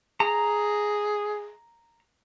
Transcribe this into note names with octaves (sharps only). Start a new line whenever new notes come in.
G#4 A#5